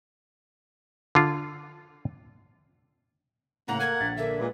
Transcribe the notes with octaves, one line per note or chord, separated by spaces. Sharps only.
D3 F4
A2 C#3 A#3 F#5 A#5
A4 A#4 G#6
A#1 A6 B6
D3 A#3 E5
A#2 G#3 B4